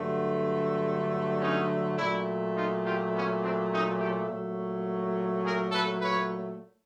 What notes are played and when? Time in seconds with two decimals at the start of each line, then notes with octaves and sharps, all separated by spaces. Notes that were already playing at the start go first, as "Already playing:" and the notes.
Already playing: G2 D3 F#3 A3
1.40 C#4 D#4
1.97 A#2 F#3 A3 D4 E4
2.55 D#4 F4
2.84 F4 G4
3.13 B3 C#4
3.42 C4 D4
3.70 C#4 D#4
4.00 G4 A4
4.29 A#2 F#3 A3
5.44 G#4 A#4
5.72 A4 B4
6.01 B4 C#5